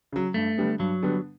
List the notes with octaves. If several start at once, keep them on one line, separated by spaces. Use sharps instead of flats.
C#3 F#3
G2 A3
D3 G3 B3
G2 F#3
D3 G3 B3